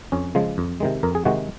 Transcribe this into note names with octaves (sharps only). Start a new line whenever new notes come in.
F2 C#4
C#3 F3 G#3
F2
C3 D#3 G#3
F2 A#4
G#4
C3 D#3 G#3 F#4